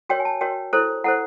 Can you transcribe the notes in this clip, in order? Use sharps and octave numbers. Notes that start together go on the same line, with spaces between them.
F#4 A#4 C#5 G5
G#5
A5
F#4 A#4 C#5 G5
E4 A4 C5
E4 A4 C5 F#5